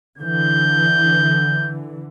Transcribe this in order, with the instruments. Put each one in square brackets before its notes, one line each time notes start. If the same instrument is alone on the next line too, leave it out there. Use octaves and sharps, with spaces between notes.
[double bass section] D3 E3 [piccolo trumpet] G6